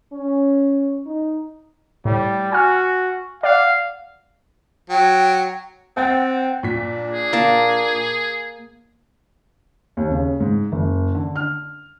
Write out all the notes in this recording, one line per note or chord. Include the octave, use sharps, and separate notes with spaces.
C#4
D#4
A2 G3
F#4 G#5 F6
D5 F5 F#5
F#3 G5
C4 F#5 G5 A6
A#2 D4 B6
G#4
A#3 A#4 A5
D#2
C#3
G#2
F#1
D3
F6